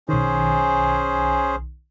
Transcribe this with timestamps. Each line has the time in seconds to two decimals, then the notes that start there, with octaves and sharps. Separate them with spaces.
0.09 B1 D#3 C#4 G#4 C5